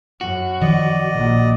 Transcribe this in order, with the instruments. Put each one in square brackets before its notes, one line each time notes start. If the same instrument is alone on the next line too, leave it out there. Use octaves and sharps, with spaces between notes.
[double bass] F#2 [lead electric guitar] F#4
[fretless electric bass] D#3 F3 [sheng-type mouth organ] D5 D#5
[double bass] A#1 A#2